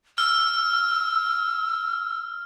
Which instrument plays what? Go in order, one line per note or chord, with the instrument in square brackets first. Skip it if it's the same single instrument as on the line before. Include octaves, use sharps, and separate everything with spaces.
[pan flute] E6 [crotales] F6